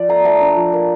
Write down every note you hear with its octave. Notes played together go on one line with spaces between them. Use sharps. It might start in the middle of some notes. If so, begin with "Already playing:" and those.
Already playing: F3 D5
A3 A#5
A3 A#5
D4
F3
A#3